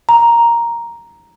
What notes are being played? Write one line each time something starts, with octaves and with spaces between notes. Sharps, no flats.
A#5